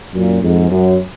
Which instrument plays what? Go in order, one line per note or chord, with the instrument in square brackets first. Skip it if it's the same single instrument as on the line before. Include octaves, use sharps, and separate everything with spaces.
[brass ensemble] F#2 A#2
F2 G#2
F#2